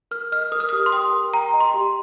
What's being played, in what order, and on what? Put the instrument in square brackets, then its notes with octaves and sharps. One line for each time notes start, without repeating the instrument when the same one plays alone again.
[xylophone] A#4 F6
D#5 F6
A#4 D#6
F6
G4 D#6
C6
G5 D#6
A#4
G5 A#5
D#5
C6
G4